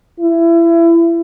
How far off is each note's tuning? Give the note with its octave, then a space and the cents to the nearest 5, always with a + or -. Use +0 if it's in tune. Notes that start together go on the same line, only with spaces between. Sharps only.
E4 +25